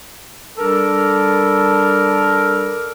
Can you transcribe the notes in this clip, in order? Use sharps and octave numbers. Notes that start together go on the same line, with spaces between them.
G3 D4 A4 A#4